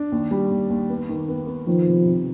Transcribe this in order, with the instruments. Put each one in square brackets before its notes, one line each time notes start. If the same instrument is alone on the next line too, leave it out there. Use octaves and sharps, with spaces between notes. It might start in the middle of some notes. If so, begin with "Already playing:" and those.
Already playing: [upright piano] D4
D#2
G3
D#2
D#2
B3
D#3
B3
B3
[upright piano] D#3 [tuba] F3
[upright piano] C3
C3